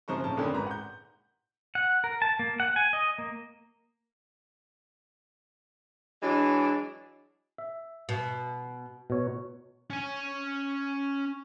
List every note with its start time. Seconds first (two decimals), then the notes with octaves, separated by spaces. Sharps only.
0.08 F#2 C#3 F3 C5 A#5 C#6
0.24 D#1 C#4 A5
0.37 F2 A#2 D3 A#3 C4 C#4
0.54 G#1 G#2 B4 A#5
0.67 F#5 G6
1.75 F#5
2.04 A#4
2.22 A5
2.39 A#3
2.60 F#5
2.76 G#5
2.93 D#5
3.18 A#3
6.22 E3 F#3 G#3 D4
7.58 E5
8.09 B2
9.10 B2 C#5
9.90 C#4 G#5